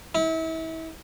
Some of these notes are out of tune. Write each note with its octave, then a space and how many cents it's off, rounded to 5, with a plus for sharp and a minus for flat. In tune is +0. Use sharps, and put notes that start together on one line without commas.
E4 -35